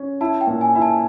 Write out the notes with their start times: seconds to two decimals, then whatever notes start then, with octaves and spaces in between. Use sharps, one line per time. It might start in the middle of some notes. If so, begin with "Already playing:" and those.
Already playing: C#4
0.21 E4 A5
0.41 G5
0.47 A#2
0.61 G#5
0.75 E4
0.82 A5